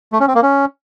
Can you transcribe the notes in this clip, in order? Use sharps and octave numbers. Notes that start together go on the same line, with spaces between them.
A3
C#4
C4
A#3
C#4